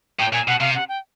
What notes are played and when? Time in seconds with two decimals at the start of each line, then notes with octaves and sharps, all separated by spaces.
0.19 A2 G5
0.33 A#2 G#5
0.47 B2 F#5
0.60 C3 F5
0.75 F#5
0.89 G5